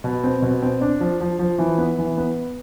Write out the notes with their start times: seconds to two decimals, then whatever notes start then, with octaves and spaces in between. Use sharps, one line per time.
0.04 B2
0.24 C4
0.42 B2
0.62 C4
0.81 D4
1.00 F3
1.21 F3
1.39 F3
1.58 E3
1.78 B3
1.98 E3
2.17 B3